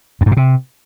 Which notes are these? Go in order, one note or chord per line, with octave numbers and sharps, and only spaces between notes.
F2
G#2
A#2
C3